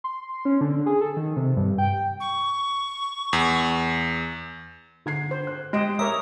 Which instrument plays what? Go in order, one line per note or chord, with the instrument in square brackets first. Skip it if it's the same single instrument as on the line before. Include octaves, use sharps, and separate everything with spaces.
[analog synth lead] C6
C#4
D3
G#4
A4
D#3
C3
G2
G5
[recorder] C#6
[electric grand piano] E2
[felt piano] D3 G#6 C7
[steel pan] C5
[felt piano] F#6
[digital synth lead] G#3 [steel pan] G4 D#5 [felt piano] F#6 D7 E7
[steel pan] A#4 C#5 E5 [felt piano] A#5 D6 [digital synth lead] D#6